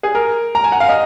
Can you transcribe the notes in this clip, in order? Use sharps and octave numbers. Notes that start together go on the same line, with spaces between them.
G#4
A#4
A#5
G#5
F#5
F5
D#5